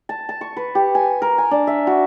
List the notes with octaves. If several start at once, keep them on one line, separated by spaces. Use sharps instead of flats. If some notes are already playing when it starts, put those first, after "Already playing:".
A5
A5
C#6
B4
G4
G#5
A#4
G#5
D4
E5
F#4